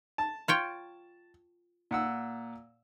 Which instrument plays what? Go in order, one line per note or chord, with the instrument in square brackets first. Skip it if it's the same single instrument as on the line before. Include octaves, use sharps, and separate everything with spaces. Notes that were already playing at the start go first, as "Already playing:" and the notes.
[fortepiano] A5
[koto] F4 C#5 G5
[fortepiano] A#2 F#5 E6